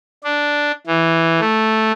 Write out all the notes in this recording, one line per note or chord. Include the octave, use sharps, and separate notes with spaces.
D4
E3
A3